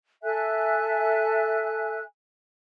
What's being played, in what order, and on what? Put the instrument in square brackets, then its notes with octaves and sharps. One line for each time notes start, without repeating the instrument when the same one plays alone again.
[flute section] A4 E5 G#5 F#6